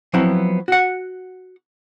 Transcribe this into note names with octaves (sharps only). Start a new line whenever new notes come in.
F3 F#3 B3 C4 E4
F#4 F#5